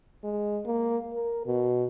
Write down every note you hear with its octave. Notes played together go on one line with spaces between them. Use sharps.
G#3
A#3
A#4
B2